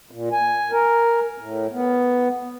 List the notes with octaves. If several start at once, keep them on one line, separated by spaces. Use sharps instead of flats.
A#2
G#5
A#4
A2
B3